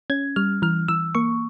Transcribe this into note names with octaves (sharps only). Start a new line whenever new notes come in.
C#4 G#6
G3 F6
E3 F6
E3 E6
A#3 C#6